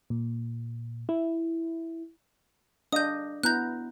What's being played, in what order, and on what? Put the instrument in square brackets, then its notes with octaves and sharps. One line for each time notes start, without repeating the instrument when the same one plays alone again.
[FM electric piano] A#2
E4
[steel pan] D4 D#5 F5 [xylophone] D#6 G6
[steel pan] B3 E4 A#5 [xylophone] F#6 G6